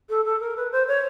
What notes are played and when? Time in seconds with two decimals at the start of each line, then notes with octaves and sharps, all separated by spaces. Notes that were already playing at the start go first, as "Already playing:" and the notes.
0.09 A4
0.24 A4
0.40 A#4
0.56 B4
0.71 C5
0.87 C#5